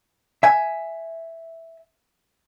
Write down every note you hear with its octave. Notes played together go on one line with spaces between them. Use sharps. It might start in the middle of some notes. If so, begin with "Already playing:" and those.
E5 G#5